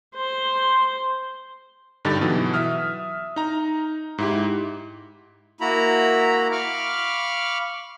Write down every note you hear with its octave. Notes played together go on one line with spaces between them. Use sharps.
C5
G2 D3 D#4 G4 A6
B2 E3 F#3
E5 D#6 F6
D#4 A#5
G#2 E4 G4
A#3 E4 F#4 A#5 B5
F5 B5 C#6 D6 F6